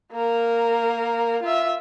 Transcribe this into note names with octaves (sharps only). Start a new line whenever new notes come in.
A#3 A#4
F4 E5